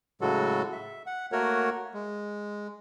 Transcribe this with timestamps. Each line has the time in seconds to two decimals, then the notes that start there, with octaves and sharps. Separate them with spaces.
0.21 A2 C#3 F#3 G#3 F#4 A4
0.72 E5
1.06 F#5
1.32 A3 A#3 F#4 A#4 C#5 F#5
1.94 G#3